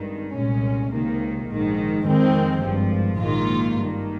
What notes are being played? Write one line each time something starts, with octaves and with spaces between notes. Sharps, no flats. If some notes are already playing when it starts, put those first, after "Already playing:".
Already playing: G#1 G2 D#3
C2 A#2 G#3 C#4
C#2 C3 D#3 A#3
A#1 G#2 D#3
F2 D#3 G#3 C4
G#1 G2 F3
A#1 G#2 D#3 A#3 F4
G#1 G2 D#3 A#3